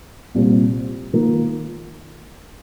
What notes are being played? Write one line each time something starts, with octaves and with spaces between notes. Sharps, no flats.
C2 A#2 G3 C4
D#3 A#3 F4 A#4